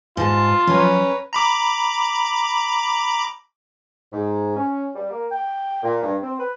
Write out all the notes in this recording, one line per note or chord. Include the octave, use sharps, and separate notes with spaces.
G#2 F4 A5
F3 F#3 C#4 B4 C#5 A#5
A#5 B5 D6
G#2
C#4
G3
A#3
G5
A#2
G2
C4
B4